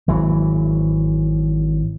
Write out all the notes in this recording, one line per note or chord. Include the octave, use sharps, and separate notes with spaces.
G#1 E3 F#3